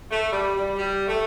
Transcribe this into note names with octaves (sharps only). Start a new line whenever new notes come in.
A3
G3
G3
G3
A3